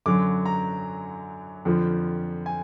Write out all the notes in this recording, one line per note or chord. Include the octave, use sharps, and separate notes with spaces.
F#2 D3 F#3 D6
A#5
F2 D3 F3
G#5